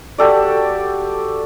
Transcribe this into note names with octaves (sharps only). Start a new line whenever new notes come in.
F#4 G4 A4 D5